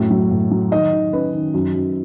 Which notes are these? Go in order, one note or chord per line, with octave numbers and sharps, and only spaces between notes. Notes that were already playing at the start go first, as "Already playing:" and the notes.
Already playing: F#2 A2
F#3
A2
F#3
D#3 D#5
D#3
C#4 B4
D#3
F#2
F#2